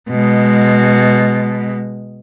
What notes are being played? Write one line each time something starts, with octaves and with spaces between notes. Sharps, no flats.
B2 G#3